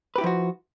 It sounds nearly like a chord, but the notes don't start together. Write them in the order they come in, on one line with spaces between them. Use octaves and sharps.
B4 G4 E4 F3 F#4